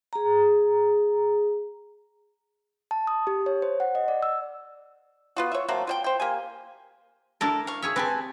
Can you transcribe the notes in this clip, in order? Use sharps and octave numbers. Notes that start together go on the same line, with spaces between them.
G#4 A#5
A5
D#6
G4
C#5
C5
F#5
D#5
D5
E6
B3 F4 F#4
C#5 E5
F#3 A3 A#3 C4
F4 C5 G5
C5 G5
A#3 G4 G#5
D4 E4 A4 A#4
F5 C#6
G#4 C#5 E5
C4 G4 B4 G#5 A5